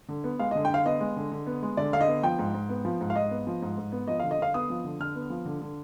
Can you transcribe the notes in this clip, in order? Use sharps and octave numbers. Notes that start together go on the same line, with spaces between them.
D3
B3
G#3 F5
D3 D#5
G5
D3 F5
B3 D#5
G#3
D3
D3
B3
G#3
D3 D5
D3 F5
D#5
B3
F3 G5
G#2
G#2
B3
F3
G#2
F5
G#2 D#5
B3
F3
G#2
G#2
B3
F3 D#5
D3 F5
D#5
D3 F5
B3 D#6
F3
D3
D3 F6
B3
F3
D3
D3